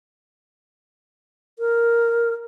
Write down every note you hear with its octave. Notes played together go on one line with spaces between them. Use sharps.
A#4